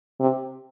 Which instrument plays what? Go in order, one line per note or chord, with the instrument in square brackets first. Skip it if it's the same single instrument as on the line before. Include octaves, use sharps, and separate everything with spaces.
[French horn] C3